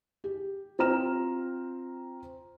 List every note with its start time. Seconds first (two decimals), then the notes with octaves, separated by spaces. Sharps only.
0.24 G4
0.79 C4 F4 G5 A#5 F6 E7